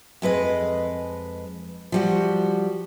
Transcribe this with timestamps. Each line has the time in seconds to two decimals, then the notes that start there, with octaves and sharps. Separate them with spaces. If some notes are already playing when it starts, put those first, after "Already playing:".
0.22 F2 G#3 B4 D#5
1.92 F3 G3 F#4